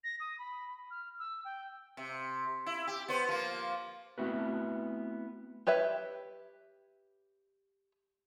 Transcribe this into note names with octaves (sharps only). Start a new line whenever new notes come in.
A#6
D#6
B5
F6
E6
G5
C3
E4
G4
B3 C5
F3 A#3
A3 B3 C4 E4 F#4 B4
G4 B4 C#5 E5